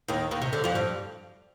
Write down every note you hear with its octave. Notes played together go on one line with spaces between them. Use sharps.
D#2 D#3
D#2 D#3
C3
D3
F2 F3
G2 G3